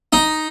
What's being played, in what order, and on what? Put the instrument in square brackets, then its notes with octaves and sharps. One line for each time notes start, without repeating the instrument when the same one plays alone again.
[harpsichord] D#4